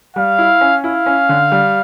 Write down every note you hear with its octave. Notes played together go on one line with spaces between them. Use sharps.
G3 F5
E4
C#4
E4 F5
C#4
D3
G3